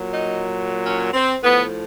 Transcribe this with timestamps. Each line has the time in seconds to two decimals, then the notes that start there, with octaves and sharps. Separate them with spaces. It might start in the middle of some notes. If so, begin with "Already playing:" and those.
Already playing: A#2 F#3
0.14 D#4
0.86 C#4
1.14 C4
1.42 A2 F3 B3